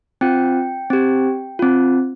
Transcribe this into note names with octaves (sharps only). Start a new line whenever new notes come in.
C4 F4 G5
C4 G4
C4 F4